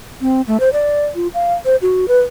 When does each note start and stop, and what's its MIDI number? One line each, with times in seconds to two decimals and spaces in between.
0.21 0.41 60
0.47 0.60 57
0.60 0.69 72
0.73 1.05 74
1.15 1.28 65
1.34 1.54 77
1.65 1.76 72
1.82 2.06 66
2.08 2.20 71